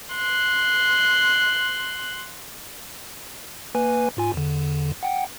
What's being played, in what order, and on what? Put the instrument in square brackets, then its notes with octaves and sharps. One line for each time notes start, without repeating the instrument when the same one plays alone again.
[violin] C6 F#6
[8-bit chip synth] A#3 B4 G#5
G#2 F4 G#5
E2 D3
F#5 G5